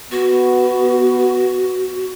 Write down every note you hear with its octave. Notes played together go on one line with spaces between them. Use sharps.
B3 F#4